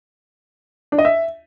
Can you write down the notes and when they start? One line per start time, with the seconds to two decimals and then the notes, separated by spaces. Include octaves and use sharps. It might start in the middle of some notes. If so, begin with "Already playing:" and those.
0.92 D4
0.99 D#5
1.05 E5